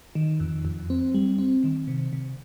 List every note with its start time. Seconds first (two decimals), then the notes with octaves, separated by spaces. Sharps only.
0.15 D#3
0.40 F2
0.65 F2
0.90 C4
1.14 G3
1.38 C4
1.64 D#3
1.88 C3
2.13 C3